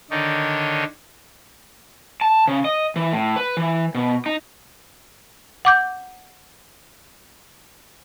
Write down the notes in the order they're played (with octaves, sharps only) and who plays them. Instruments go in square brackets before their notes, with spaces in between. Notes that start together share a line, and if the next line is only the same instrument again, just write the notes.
[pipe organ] D3 D#3 D4 D#4 C#5
[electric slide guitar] A5
C#3
D#5
E3
A2
B4
E3
B2
D#4
[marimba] F#5 D6 G6